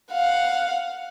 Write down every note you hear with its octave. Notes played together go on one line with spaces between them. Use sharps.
F5 F#5